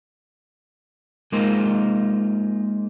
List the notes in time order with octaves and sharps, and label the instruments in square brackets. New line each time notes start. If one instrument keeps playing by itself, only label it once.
[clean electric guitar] G#3 A#3 D#4 F4 A#4 C5